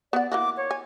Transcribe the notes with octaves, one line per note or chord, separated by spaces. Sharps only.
B3 D5 F#5
E3 A#3 F#4 D6
C#5
G#5